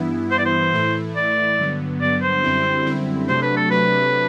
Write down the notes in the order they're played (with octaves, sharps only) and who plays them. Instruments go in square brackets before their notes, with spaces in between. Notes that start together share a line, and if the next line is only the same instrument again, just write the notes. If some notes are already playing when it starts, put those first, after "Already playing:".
Already playing: [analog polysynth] G2 E3 B3 E4
[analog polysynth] G2 E3 B3 E4 [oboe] C5
[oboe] D5
C5
[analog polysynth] A2 E3 A3 E4
[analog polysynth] A2 E3 A3 E4 [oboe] D5
[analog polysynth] G2 D3 F#3 B3
[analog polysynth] G2 D3 F#3 B3 [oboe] D5
[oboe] C5
[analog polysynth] F#2 D3 G3 C4 E4
F#2 D3 G3 C4 E4
[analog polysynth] C3 F#3 A3 D4 [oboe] C5
[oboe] B4
A4
[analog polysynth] C3 F#3 A3 D4 [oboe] B4